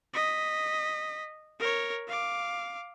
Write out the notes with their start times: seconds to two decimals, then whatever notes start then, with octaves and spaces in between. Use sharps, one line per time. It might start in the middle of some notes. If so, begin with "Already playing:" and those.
0.14 D#5 B6
1.59 A#4 C#5
2.07 F5 D6